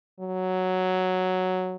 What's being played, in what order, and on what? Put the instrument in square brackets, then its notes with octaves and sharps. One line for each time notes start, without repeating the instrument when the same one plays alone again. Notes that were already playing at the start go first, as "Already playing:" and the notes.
[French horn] F#3